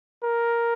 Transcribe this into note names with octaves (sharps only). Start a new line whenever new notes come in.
A#4